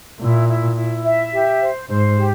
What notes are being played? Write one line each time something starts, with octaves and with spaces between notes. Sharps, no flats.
A#2 E4
E4
E4
E5
G4
C5
G#2 C5
G4